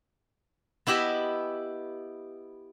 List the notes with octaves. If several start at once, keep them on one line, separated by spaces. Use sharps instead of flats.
B3 E4 G4 D#5 E5 G#5